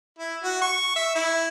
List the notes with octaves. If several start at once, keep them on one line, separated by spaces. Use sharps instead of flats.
E4
F#4
C#6
E5
E4